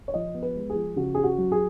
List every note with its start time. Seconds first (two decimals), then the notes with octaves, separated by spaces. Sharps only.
0.08 C#5
0.14 F3 D#5
0.34 B3
0.42 B4
0.56 G#3
0.70 G#4
0.76 F3
0.96 C#3 F#4
1.15 C#4 G#4
1.24 F#4
1.38 F#3
1.52 G#4